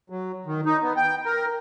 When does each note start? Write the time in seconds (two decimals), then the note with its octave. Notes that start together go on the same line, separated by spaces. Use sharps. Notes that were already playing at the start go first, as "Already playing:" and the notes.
0.10 F#3
0.46 D#3
0.65 D#4
0.83 B3
0.96 G5
1.25 A#4